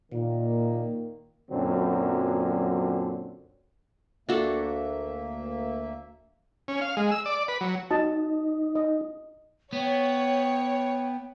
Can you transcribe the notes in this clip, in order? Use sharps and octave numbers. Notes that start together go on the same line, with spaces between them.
A#2 D#3 A#3
F#2 A#2 D3 F#3 C4
D2 A#3 D4 F#4 A4 E5
C#4
F5
G#3
E6
D5
B4
F#3
D#4 F#4 D#5 A5
D#5
B3 C#5 G5